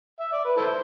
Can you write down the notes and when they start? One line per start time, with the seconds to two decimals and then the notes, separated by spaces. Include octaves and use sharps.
0.20 E5
0.32 D5
0.45 B4
0.57 E4 A4 C5